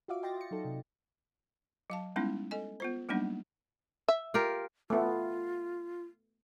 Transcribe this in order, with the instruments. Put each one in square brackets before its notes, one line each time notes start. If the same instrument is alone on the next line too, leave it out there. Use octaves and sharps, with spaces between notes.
[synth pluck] F4 F#4 D5 E5 F5 D6
D#5 G5 C6 A6 A#6
D#5 C#7
F#3 D#4 A4
C3
[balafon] F#3 F5 A5
G3 G#3 B3 C#4 D#4 E4
A4 D#5 G#5
B3 F4 C5
F#3 G3 A#3 B3 D4 D#4
[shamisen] E5
[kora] F4 G4 A#4
[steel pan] A3 B3 [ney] F4